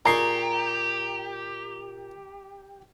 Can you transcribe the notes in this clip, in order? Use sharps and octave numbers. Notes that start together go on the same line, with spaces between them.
A#2 G4 G#4 A#5 C#6 C7